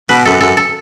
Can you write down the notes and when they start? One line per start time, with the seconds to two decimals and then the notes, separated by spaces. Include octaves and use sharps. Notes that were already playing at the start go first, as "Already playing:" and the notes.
0.09 B2 B4
0.25 F#2 A4
0.41 F#2 A4
0.57 A4